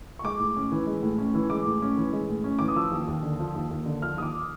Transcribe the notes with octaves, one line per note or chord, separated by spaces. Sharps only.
C#6
G#3 D6
A2
C#4
E3
G#3
A2
C#4
E3
G#3 D6
A2
C#4
E3
G#3
A2
C#4
E3 D6
D#6
F3 E6
D#2
D#2
D3
F3
D#2
D#2
D3
F3 F6
D#2 D#6
D6